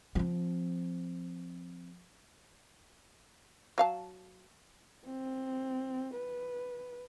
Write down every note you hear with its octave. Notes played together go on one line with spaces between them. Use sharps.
F3 C4
F#3 F5 A5
C4
B4